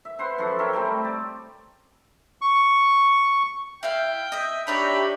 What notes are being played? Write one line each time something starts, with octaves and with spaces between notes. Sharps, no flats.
E5
B4 C5 F#5 C6
F#2 F3 A4 F#5
A#4 C#5 E5 G5
G3 A3 C4
D5
C#6
E4 F5 G5
D#5 E5
D4 D#4 G4 C#5 E5 B5